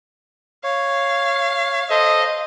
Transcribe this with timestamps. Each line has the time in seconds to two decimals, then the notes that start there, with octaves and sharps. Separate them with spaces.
0.64 C#5 F5
1.90 A4 C5 D#5